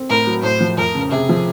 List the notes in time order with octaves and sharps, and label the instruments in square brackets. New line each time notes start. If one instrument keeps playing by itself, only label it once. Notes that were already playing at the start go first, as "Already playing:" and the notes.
Already playing: [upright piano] C4
[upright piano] A2 [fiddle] A#4
[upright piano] F#3
[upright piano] A2 [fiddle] C5
[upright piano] F3
[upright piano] F2 [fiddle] A#4
[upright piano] C#3
[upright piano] C3 [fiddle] G#4
[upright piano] F3